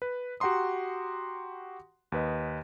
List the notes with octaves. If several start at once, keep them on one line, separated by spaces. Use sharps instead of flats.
B4
F#4 G4 F#5 A#5 C6 D#6
D#2 B4 D#5